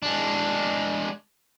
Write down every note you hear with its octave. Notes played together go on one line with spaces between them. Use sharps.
G#3 D4